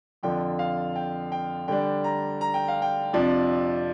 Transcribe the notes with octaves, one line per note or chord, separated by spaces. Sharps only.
F2 D3 F3 D4 G5
F5
G5
G5
D3 G3 D4 G5
A#5
A#5
G5
F5
G5
F2 C3 F3 D4